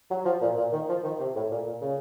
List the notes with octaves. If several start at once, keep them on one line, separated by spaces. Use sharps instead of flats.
F#3
F3
A#2
A#2
D#3
F3
D#3
C3
A2
A#2
A#2
C#3